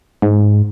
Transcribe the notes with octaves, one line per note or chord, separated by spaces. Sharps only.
G#2